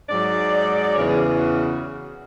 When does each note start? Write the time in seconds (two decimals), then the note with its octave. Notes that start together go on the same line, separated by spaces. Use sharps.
0.09 G#2 F#3 D5
0.95 E2 C#3 E3 C#5
1.09 G#4
1.24 G#4
1.38 F#4